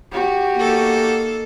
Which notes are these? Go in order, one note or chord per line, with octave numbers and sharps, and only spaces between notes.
F#4 G4
A#3 D#4 A4